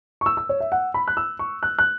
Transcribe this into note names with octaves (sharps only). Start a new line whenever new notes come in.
C#6
E6
E6
C#5
E5
F#5
B5
F#6
E6
C#6
F#6
F#6